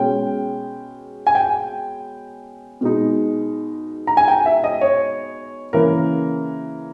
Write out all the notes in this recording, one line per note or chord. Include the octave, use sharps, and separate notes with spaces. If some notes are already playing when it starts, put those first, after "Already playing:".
Already playing: B2 G#3 C#4 G5
G#5
G5
B2 G#3 D#4
A#5
G#5
G5
E5
D#5
C#5
C#3 E3 A#3 C#4 E4 A#4